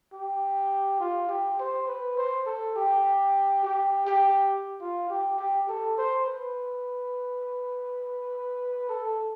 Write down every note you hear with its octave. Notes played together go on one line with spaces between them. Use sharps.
G4
F4
G4
C5
B4
C5
A4
G4
G4
G4
F4
G4
G4
A4
C5
B4
A4